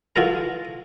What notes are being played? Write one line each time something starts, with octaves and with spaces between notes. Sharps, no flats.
E3 F4 F#4 A4 A#4 A#5